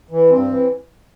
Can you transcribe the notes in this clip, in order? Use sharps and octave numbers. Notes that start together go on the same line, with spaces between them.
E3
G2 C4
E3